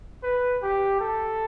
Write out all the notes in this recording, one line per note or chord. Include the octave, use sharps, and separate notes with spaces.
B4
G4
A4